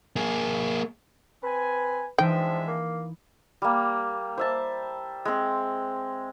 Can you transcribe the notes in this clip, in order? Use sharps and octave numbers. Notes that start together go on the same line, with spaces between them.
A#3 G#4
C4 B4 G#5
E3 F3 G#3 D4 D#4 E5 G5
A#3
G3 A#3
C5 E5 A5
G#3 C4